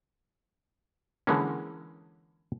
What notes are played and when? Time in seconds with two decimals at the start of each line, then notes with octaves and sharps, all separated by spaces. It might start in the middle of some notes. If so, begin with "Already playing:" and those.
1.27 D3 E3 G#3 A#3 C#4